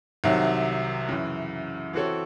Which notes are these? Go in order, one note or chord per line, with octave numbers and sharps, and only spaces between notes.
C2 C3 D#3 F#3
F#2 C#3 E3
E3 C4 F#4 A4 C#5